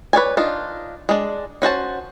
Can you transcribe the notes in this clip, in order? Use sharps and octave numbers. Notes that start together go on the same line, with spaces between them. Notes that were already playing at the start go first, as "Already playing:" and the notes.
B4 C#5 D5 G#5
D4 D#4 F4
G#3 D4
C#4 F#4 C5 A5